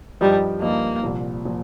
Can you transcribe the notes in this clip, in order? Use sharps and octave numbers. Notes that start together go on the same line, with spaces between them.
G2 F3 G3 D#4
G2 F3 A#3 D#4
C2 A#2 F3
A#2 F3